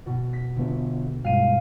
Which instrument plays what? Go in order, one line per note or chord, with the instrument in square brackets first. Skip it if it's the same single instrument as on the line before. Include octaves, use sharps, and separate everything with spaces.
[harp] B2
B6
[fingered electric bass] D3 B3
[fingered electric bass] G2 B2 G#3 [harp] F5 D#7